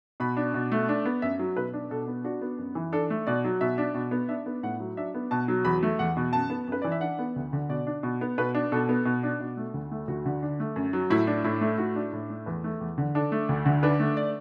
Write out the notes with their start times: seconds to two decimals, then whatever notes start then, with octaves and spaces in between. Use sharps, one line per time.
0.20 B2 B5
0.37 D4
0.54 B2
0.72 A3
0.89 D4
1.06 B3
1.22 F#2 E5
1.39 F#3
1.57 B2 B4
1.73 D4
1.90 B2 A4
2.08 B3
2.24 D4 F#4
2.41 B3
2.59 F#2
2.75 E3
2.93 D4 A4
3.10 A3
3.27 B2 D5
3.44 F#3
3.61 B2 E5
3.78 D4
3.94 B2
4.11 B3
4.29 D4 E5
4.46 B3
4.63 A2 F#5
4.80 F#3
4.97 D4 E5
5.15 B3
5.31 B2 A5
5.48 F#3
5.65 E2 B5
5.83 A3
5.99 E2 F#5
6.17 B2
6.33 F#2 A5
6.50 B3
6.68 F#2 B4
6.82 E3 D5
6.92 E5
7.01 D4 F#5
7.19 B3
7.36 D2
7.53 D3
7.69 B2 D5
7.87 D4
8.03 B2
8.21 B3
8.38 B2 B4
8.55 D4
8.72 B2 A4
8.89 B3
9.05 B2
9.23 D4
9.40 B2
9.57 A3
9.74 D2
9.91 A3
10.08 D2 F#4
10.26 D3
10.43 D4
10.60 A3
10.76 F#2
10.93 F#3
11.10 A2 E4
11.27 D4
11.44 A2 E4
11.61 A3
11.78 A2 F#4
11.96 D4
12.13 A2
12.30 A3
12.46 E2 B4
12.64 A3
12.81 E2
12.98 D3
13.15 D4 A4
13.32 A3
13.49 D2
13.66 D3
13.83 D4 B4
14.00 A3
14.17 D5